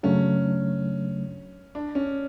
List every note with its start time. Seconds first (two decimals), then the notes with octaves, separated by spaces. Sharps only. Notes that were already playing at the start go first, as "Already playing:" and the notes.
0.03 F#2 C#3 F#3 A3 C#4 D4
1.75 D4
1.95 C#4